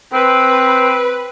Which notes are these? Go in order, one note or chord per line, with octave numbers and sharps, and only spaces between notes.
C4 B4